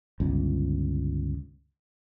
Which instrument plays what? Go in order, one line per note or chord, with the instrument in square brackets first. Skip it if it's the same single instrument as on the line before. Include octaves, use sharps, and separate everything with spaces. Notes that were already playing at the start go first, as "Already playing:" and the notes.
[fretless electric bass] G1 C#2